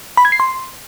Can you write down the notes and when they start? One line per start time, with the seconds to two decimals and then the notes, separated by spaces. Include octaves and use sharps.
0.17 B5
0.25 G#6
0.32 C7
0.40 C6